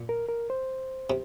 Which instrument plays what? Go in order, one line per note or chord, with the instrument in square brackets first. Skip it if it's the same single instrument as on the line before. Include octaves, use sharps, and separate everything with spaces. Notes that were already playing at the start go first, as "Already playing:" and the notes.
Already playing: [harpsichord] A#2
[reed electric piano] A#4
A#4
C5
[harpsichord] C3